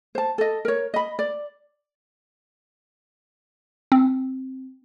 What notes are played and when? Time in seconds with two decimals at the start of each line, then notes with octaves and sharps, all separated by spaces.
0.15 C5 A5
0.38 A4 D#5
0.65 A#4 C#5
0.94 D#5 B5
1.19 D5
3.92 C4